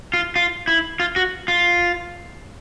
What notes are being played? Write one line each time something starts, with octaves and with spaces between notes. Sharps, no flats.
F4
F4
E4
F4
F#4
F4